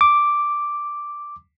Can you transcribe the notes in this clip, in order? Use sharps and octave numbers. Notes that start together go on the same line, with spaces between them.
D6